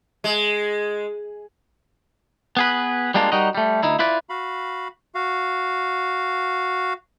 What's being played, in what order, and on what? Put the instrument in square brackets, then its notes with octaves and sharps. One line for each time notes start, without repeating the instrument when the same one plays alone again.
[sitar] G#3
[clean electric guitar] B3 G#4 B4
G3 G#3 A#3 D4 F4
G3 D#4 F#4 A#4 D#5
G3 A3
D2 D#4 E4
E4 F4 B4 D5
[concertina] F#4 F5 B5
F#4 F5